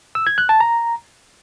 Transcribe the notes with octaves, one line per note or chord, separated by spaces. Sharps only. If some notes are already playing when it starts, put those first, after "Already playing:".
E6
G#6
F#6
A5
A#5